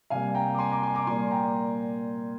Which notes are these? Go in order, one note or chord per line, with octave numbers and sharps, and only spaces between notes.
C3 G3 A#3 F5 G#5
G5 A#5
D6
G#5 C6
A#5 D6
G#5 C6
A#5 D6
A#2 G3 A#3 G#5 C6
G5 A#5